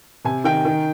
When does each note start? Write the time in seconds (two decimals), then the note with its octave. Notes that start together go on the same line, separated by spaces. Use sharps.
0.25 C3 G#5
0.44 D#3 G5
0.65 D#3